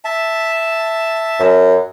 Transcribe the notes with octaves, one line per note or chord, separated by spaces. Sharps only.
E5 A5
F#2